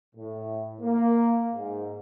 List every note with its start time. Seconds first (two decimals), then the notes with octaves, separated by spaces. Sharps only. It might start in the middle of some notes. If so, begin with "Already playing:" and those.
0.16 A2
0.81 A#3
1.53 G#2